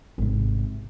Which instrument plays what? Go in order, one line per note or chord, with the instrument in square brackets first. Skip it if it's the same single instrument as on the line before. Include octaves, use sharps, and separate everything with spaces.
[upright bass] G#1 C3